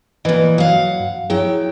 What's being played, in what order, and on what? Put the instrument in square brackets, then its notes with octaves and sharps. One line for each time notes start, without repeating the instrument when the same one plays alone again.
[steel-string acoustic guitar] A#2 E3 [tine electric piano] B4 D#5
[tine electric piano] F#3 [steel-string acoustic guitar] F5 F#5
[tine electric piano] G2
[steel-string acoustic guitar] F#3 G5 [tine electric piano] E4 G#4